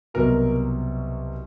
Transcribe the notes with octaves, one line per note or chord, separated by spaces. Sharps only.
C2 B2 F#3 A#4